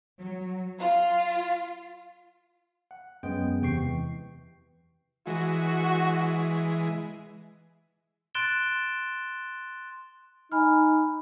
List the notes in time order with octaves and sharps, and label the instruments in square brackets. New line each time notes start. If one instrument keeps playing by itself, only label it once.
[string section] F#3
F4
[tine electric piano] F#5
F#2 G#3 B3 G5
E2 C3 G5 C#6 C7
E3
[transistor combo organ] E3 G#3 [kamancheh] F#4
[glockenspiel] C6 F#6 A6 D7 E7 G7
[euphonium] D#4 [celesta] G#5 B5 F6